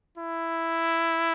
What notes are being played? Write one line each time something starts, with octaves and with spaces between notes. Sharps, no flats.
E4